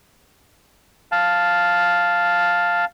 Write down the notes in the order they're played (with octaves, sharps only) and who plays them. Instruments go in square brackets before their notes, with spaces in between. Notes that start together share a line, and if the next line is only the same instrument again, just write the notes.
[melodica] F5 A5